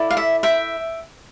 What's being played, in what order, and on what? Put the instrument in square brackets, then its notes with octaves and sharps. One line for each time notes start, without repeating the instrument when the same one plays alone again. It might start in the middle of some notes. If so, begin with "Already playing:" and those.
Already playing: [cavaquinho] E4 A4 D5
F5
E5
E5 G5